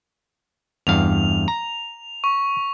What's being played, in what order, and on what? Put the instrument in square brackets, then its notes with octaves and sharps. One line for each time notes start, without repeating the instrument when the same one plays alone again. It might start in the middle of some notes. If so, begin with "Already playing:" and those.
[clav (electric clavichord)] E2 G2 F5 [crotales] F7
[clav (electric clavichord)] A#5
[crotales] C#6